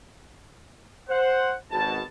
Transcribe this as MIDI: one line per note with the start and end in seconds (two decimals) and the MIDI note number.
1.09 1.54 72
1.09 1.54 78
1.71 2.01 32
1.71 2.01 47
1.71 2.01 81